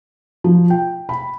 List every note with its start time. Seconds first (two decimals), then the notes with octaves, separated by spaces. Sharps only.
0.44 F3
0.70 G5
1.09 B5